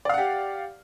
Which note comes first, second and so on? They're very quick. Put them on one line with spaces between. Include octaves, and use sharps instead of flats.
D5 F5 F#5 G4